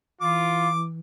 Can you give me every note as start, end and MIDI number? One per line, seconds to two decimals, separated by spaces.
0.21 0.99 52
0.21 0.69 65
0.21 0.81 86